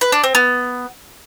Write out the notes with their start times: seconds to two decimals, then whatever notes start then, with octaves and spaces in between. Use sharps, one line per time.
0.01 B4
0.12 D4
0.23 C4
0.35 B3